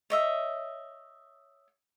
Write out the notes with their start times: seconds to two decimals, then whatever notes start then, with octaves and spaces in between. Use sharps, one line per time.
0.10 C#5 D#5 E5